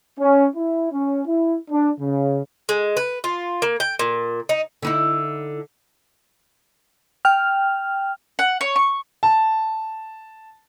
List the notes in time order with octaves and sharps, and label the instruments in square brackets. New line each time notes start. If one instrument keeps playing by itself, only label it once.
[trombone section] C#4
E4
C#4
E4
D4
C#3
[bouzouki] G#3
B4
F4
A#3
G5
A#2
D#4
[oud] D3 D#4 E4
[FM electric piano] G5 F6
[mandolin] F#5
C#5
C#6
[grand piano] A5